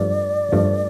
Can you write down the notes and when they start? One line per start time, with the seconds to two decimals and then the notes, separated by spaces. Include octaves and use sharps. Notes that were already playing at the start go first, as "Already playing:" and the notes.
Already playing: G2 F3 A3 D5
0.52 G2 F3 A3